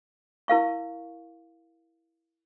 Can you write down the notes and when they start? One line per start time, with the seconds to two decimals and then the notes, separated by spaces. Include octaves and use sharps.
0.48 E4 A#4 F5 C#6